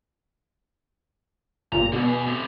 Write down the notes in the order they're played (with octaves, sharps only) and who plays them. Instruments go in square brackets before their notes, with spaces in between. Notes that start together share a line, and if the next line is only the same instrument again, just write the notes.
[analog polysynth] G1 A#2 [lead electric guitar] A#5
[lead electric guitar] G#2 D3 [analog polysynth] B2
[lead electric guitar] B3 G#4
A2 C3